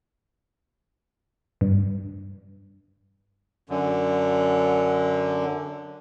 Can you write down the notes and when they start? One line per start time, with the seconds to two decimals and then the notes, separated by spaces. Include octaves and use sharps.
1.61 G2
3.69 F#2 D3